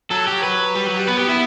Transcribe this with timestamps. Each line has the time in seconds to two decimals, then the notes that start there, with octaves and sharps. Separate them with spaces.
0.11 F#3 A4
0.27 G4
0.43 B4
0.75 G3
0.87 F#3
0.97 G3
1.08 B3 B4
1.19 G4
1.29 E4